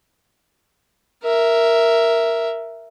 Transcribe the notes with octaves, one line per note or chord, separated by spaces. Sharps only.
A#4 E5